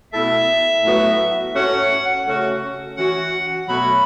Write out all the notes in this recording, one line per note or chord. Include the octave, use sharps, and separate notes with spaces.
B2 A3 E4 A4 E5
A2 F#3 B3 F#4
A2 A3 C#4 F#4 C#5 F#5
C#3 A3 C#4 F#4
E3 C#4 F#4 F#5
B2 F#3 A3 F#4 C#5 B5